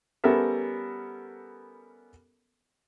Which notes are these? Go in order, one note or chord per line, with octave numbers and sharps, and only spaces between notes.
G3 B3 C#4 A4 A#4 E5